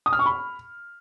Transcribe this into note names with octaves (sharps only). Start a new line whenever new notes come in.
D#6
F6
C#6
B5